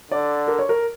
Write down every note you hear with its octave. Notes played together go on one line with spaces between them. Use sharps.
D3 D5
A#4
C#5
A#4